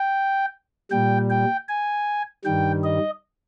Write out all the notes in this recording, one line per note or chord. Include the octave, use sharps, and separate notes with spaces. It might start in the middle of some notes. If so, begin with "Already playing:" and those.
Already playing: G5
A#2 G3 G5
G5
G#5
G2 D#3 G3 G5
D#5